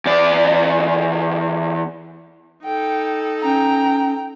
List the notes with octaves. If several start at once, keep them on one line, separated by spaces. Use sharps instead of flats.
E2 D5
D#4 A4 G5
C#4 G5 A#5